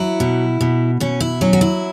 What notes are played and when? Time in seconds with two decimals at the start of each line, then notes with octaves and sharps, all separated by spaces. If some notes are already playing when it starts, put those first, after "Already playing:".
Already playing: F#3 E4
0.20 B2
0.61 B2
1.00 B2 C#4
1.20 E4
1.41 F#3 C#4
1.53 F#4
1.61 E4